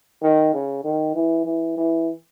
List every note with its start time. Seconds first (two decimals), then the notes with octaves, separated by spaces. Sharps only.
0.22 D#3
0.54 C#3
0.84 D#3
1.15 E3
1.45 E3
1.77 E3